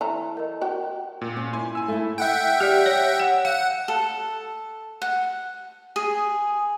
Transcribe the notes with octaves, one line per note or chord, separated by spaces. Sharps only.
E3 A4 A#5
A#4 D#5
F#4 G5
A#2
C#4
E4 G#5 C6
G#5 E6
A3 E4
E5 F#5 G5
G4 D5
C#5
F#5
F5 F#5
A4
F#5
G#4